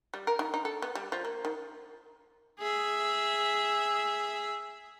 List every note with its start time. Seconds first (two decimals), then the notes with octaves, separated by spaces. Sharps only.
0.14 G3
0.27 A#4
0.39 D#3
0.54 D#4
0.65 A4
0.82 B3
0.95 G3
1.12 F3
1.25 A#3
1.45 D#3
2.60 G#4 E5